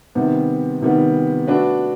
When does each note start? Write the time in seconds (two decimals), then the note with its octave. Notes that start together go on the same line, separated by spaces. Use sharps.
0.15 C3 D#3 G3 B3
0.81 C3 D#3 G3 B3
1.48 A3 D4 F#4 B4